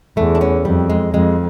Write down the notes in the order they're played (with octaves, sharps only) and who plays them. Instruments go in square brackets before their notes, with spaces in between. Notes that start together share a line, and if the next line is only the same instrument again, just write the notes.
[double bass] E2 [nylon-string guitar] A3
[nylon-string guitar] D4
C#4
[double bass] F2 [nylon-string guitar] G3
[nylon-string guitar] G#3
[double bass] F2 [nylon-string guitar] G#3